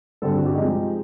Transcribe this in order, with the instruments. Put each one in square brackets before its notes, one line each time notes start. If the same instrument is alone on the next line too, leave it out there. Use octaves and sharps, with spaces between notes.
[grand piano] G2 D3 G3 C4 A4
F#4
G4
C3 F3 G#3 C4 D#4